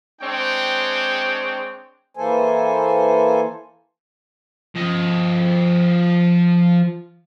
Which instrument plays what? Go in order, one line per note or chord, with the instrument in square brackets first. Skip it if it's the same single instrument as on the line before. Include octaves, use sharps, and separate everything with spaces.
[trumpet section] G#3 C4 D4 C#5 G5
[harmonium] E3 A#3 A4 C5 G#5
[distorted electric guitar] F3 D#5